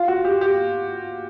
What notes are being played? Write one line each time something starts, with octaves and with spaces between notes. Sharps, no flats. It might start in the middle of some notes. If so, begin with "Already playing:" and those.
Already playing: F4
F#4
G4
G4